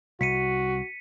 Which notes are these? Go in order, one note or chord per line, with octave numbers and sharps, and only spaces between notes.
C2 F#4 B6 C#7 D#7